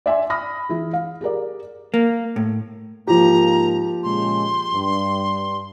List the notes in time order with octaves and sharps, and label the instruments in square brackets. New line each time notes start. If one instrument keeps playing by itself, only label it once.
[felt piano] D5 E5 G#5 C6
B5 D#6 F6 A#6
E3 E4 G#4
F5
G4 G#4 A#4 D5
[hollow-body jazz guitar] A#3
A2
[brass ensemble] G#2 A#3 [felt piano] F3 G4 [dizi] A#5
[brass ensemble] A#2 C#3 G#3 [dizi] C6
[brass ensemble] G2